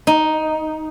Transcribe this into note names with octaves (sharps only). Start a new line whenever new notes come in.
D#4